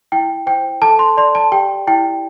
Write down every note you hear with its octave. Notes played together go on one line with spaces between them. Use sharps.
E4 G5
C5 G5
A4 A5
C6
D5 C6
A5
G4 G5
E4 G5